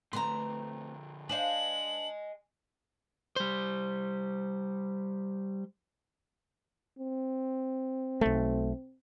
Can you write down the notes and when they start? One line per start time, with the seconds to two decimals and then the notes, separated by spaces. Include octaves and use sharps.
0.13 D3 F3 A3 C4 B4 A#5 C6
1.29 D4 C5 D#5 F5 G#5 F#7
3.36 G3 C5
6.98 C4
8.21 B1 A3